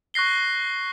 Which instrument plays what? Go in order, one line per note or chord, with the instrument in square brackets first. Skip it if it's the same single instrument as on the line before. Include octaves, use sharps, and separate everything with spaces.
[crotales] C#6 F#6 A#6 C7 G7